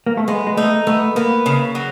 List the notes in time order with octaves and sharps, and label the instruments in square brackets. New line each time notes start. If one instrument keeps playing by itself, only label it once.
[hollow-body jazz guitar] A#3
A3
[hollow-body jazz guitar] G#3 [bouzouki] B3
[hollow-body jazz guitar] G#3
[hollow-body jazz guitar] A3 [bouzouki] D#4
[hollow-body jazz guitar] A3 [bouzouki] B3
[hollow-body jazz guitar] A#3 [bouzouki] B3
[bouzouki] C#3
F#3